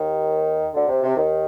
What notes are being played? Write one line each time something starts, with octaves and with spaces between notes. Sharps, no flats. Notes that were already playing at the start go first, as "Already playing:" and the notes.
Already playing: D#2 D#3
D2 D3
C3
C3
D#2 D#3